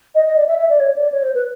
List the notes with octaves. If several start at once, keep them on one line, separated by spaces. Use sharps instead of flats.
D#5
D#5
D5
E5
E5
D5
C#5
D5
C#5
C5
B4